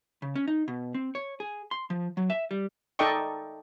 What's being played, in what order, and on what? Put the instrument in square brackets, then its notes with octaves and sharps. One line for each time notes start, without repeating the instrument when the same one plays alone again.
[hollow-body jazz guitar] C#3
C#4
D#4
B2
C4
C#5
G#4
C6
F3
F#3
E5
G3
[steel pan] D#4 A4 D5 D#5 G5 C#6